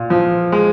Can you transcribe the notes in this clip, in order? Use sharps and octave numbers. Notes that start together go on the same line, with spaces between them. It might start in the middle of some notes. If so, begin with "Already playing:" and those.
Already playing: A#2
F3
G#3